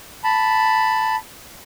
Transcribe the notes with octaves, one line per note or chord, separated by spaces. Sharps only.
A5 B5